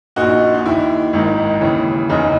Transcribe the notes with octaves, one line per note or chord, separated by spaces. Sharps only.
A#1 A#2 D#4 F#4
D#4
D#2 D#3 E4
G#1 G#2 D#3
D#2 C#3 E3
F#1 E2 C#3 E3 D#4